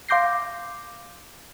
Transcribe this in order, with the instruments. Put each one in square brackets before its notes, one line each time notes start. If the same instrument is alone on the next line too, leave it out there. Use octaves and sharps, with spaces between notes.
[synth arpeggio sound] F5 C6 D6 G6 A#6 C7